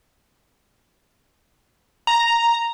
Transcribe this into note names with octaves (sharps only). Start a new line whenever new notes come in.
A#5